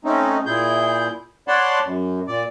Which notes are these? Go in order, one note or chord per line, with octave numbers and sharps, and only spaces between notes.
A3 C4 C#4 D#4
A#2 E4 G#4 G6
C#5 D5 F#5 A5 B5 C6
F#2
A#2 D5